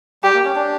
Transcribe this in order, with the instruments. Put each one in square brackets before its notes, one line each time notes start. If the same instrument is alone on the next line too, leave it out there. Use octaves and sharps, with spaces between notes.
[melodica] G3 [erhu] G4
[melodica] A#3
C#4
D4